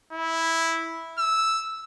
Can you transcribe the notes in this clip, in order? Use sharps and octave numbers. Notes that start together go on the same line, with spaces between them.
E4
E6